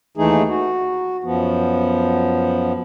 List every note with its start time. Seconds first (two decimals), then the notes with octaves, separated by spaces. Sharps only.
0.17 D#2 E3 A3 D#4 G#4
0.49 F#4
1.24 F#2 F3 B3